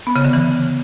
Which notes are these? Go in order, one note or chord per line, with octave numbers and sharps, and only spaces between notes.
B3
C#3
D3
E3